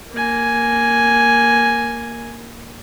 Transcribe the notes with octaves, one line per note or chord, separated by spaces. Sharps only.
A#3 G#5